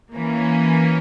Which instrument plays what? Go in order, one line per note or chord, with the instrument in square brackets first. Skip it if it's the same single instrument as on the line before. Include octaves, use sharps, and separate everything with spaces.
[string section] E3 A#3 C#4